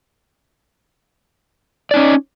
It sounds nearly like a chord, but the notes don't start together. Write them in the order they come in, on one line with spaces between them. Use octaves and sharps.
D5 D#4 C#4